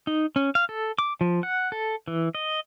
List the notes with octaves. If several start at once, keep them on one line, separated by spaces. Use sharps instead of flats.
D#4
C#4
F5
A4
D6
F3
F#5
A4
E3
D#5